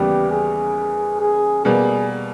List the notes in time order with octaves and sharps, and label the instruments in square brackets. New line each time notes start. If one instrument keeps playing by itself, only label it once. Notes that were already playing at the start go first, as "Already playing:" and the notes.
Already playing: [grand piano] D#2 C#3 E3 G3 B3 [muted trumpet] G4
[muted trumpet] G#4
G#4
[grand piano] B2 G3 A#3 [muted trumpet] G#4